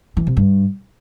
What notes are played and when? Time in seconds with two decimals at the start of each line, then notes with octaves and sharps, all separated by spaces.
0.17 E3
0.27 C3
0.37 G2